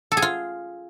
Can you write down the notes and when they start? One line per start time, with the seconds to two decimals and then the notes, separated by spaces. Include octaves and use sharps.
0.12 A4
0.17 G#4
0.22 F4